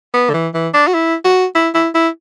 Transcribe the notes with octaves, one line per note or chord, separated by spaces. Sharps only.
B3
D3
E3
E3
D4
F#4
E4
F#4
E4
E4
E4